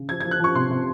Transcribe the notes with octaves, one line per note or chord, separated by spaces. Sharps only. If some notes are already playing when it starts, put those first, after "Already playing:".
Already playing: C#3
F3 G#6
G#6
F3
F#6
F3 C#6
C3 C6
C3